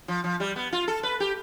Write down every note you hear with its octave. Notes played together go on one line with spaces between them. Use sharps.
F3
F3
G3
B3
F4
A4
B4
G4